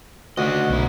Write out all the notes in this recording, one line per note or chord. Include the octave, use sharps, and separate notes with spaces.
D2 C#3 F#4 D#5
B1 F#2 E4